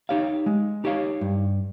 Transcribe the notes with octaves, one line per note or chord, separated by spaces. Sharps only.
D#4 G4 C#5 F5
G#3
D#4 G4 C#5 F5
G2